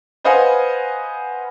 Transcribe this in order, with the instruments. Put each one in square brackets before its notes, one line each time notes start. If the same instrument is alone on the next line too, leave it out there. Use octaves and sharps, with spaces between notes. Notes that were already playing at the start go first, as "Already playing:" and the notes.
[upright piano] B4 C5 D#5 F5 F#5 G#5